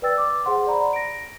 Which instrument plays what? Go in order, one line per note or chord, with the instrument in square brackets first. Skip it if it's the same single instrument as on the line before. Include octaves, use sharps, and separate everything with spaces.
[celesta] B4 D5 G5 E6 A6
D6
G#4 C5 F#5 C6
D5 A#5 B5
A#6 D7